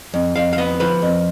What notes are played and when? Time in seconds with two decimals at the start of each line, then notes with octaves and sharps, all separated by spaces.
0.14 F2
0.36 F2 F5
0.53 F5
0.58 B3 D#5
0.80 F3 B4
1.02 F2